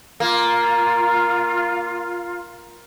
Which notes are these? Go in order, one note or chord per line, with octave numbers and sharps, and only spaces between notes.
A#3 F4